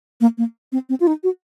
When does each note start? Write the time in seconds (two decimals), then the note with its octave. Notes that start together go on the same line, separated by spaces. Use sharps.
0.21 A#3
0.38 A#3
0.72 C4
0.89 C4
1.00 F4
1.07 D#4
1.23 F#4